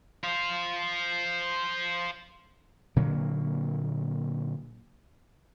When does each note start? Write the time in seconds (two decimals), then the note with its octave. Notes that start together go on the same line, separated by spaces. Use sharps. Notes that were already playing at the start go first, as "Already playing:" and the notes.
0.24 C5 F5
2.96 A#2 D3 F#3 A#3